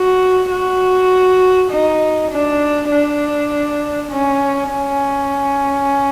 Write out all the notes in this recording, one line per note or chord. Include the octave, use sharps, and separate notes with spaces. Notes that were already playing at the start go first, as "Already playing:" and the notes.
Already playing: F#4
F#4
D#4
D4
D4
C#4
C#4